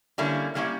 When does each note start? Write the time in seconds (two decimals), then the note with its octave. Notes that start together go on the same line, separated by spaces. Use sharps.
0.18 D3 G3 A#3 C#4 E4
0.55 D3 G3 A#3 C#4 E4